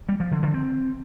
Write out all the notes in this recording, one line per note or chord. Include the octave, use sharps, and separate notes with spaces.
G3
F3
D3
D3
C4